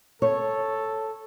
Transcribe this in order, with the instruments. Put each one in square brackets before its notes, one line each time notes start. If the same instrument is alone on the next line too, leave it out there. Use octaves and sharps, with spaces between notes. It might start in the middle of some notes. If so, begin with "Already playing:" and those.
[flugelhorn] A4 [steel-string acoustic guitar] C#5